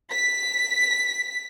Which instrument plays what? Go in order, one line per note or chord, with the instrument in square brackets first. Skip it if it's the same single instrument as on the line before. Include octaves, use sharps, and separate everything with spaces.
[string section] B6